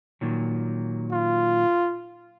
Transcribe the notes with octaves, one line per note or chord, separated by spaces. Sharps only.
A#2 D#3 F#3
F4